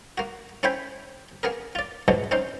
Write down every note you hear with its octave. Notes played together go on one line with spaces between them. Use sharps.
A#3 F#4
C#4 E4 C5 G5 G#5 B5
A#3 B3 G#4 A#4
F4 D5
A#1 F2 G#2 B2 E3 F#3
C4 C#4 D#4 C5